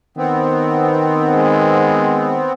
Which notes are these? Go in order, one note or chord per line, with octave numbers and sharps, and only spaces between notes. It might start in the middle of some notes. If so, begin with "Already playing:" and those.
D#3 B3 C4
G#3